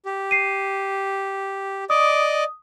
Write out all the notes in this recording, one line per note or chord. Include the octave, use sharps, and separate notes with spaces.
G4
C7 D#7
D5 D#5 D6 D#6